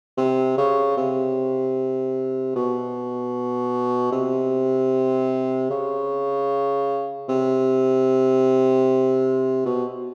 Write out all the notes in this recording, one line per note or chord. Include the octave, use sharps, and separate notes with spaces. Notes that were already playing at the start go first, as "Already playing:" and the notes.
C3
C#3
C3
B2
C3
C#3
C3
B2